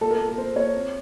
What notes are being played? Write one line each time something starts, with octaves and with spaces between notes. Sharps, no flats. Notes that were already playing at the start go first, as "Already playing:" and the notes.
A#2 A4
A#4
A#3
A4
A#3 C5
A#3 C#5
C4